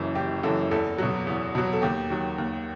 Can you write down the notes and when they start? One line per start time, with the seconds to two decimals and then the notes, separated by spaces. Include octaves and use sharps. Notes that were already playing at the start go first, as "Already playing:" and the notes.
Already playing: F#1 F#2 E3
0.15 F#1 G4
0.43 F#2 E3 A4
0.71 E2 A4
0.98 B2 F#3
1.27 E2
1.55 B2 F#3
1.73 A4
1.82 D#2 G4
2.10 D#3 F#3
2.38 D#2